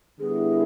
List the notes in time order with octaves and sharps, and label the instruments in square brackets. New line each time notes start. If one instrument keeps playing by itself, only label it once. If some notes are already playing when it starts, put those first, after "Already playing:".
[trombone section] D3 G3 B3 E4 [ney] G#4